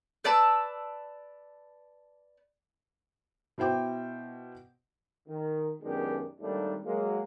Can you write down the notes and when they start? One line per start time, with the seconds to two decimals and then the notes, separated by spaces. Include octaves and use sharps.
0.24 B4 D5 A5 E6
3.58 B2 E4 C5 G5 D6
5.28 D#3
5.83 F#2 B2 D#3 G#3 D4 G4
6.40 G#1 D#2 G3 A3 D4 D#4
6.84 F#3 G#3 A#3